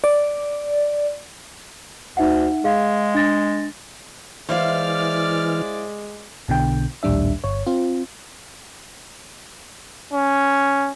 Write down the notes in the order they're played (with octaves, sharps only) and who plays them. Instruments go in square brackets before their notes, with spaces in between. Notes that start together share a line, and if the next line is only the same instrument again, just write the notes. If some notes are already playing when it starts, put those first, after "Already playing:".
[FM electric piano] D5
[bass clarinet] D2 [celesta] D#4 E5 F#5
[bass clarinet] G#3 [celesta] G#4 F5
[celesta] D4 A6 A#6
[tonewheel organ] E3 F6 [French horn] G#3 [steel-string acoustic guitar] E4 C5 F5 [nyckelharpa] D5
[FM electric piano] B1 B2 D3 G5
A#1 D#2 A2 G3 D4 E5
G1 C#5
C4 F4
[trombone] C#4